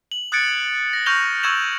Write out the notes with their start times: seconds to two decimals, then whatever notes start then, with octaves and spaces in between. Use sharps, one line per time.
0.12 F#7
0.32 D#6 F#6 G#6 A6 C#7 D7
0.93 A#6
1.06 C#6 F6 G6 A#6 F7 G7
1.43 C#6 E6 G#6 A#6 E7 F#7